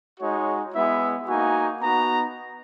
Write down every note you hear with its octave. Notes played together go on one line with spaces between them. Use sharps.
G#3 D#4 F#4 C#5
G#3 B3 E4 E5
A#3 D#4 F#4 G#5
B3 D#4 F#4 A#5